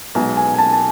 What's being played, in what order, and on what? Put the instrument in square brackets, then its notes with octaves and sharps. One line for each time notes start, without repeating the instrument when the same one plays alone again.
[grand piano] B1 B2 G#3 [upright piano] G#5
[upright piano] G#5
G#5
A5
A5